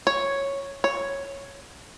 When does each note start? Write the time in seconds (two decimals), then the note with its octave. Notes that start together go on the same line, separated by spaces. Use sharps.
0.07 C#5
0.84 C#5